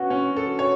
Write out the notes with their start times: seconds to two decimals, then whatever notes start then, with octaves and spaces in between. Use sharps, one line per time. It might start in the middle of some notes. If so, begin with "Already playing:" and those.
Already playing: B3 C#4 F#4
0.10 C#4
0.36 A4
0.59 C#5